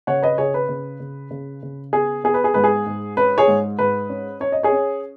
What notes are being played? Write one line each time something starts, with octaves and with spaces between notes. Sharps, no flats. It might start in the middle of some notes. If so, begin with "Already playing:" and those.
C#3 C#5 F#5
B4 D#5
C#3 G#4 C#5
B4
C#3
C#3
C#3
C#3
B3 G#4
B3 G#4
B4
G#4
G#2 B4
G#4
G#2
C#4 B4
G#4 C#5
G#2
G#2 B4
C#4
C#4 C#5
D#5
G#4 C#5
C#4